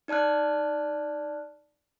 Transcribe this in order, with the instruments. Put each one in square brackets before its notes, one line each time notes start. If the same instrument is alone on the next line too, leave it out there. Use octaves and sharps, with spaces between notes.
[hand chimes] D#4 D5 A5 F6 F#6